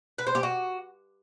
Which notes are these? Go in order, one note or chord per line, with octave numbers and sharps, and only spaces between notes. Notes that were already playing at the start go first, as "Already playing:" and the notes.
B4
C5
G4
F#4